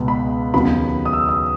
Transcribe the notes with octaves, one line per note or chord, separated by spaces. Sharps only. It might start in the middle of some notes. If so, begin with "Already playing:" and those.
Already playing: C#2 B2 G#3 B3
B5
D#2 C#3 F#3 B3 B5
D#6
E6
D#6